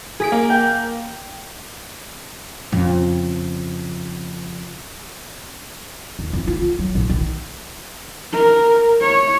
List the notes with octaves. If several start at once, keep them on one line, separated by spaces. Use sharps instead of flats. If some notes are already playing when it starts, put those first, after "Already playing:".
G#4 B6 D7
A#3
G5
F2 C#3
D#2
F2
F4
D3
F#3
A#1
D#3
A#4
C#5